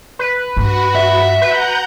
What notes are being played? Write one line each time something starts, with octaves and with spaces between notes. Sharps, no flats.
B4
G2 F#4
E5
B4 F#5 A#5 G6